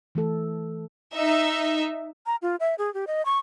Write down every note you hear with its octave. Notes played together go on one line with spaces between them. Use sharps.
E3 A3 A4
D#4 E5
A#5
F4
E5
G#4
G4
D#5
C#6